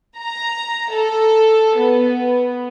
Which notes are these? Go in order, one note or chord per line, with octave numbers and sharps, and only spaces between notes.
A#5
A4
B3